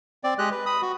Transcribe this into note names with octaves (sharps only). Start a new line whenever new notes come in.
C4 D5
G#3 G4 D#5 F#6
B4
B5 D#6
F#4